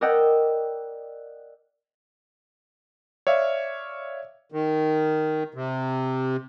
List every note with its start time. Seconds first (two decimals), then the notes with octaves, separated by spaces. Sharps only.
0.01 A#4 D5 D#5 F#5 G5 E6
3.27 C#5 D5 E5 F5
4.52 D#3
5.54 C3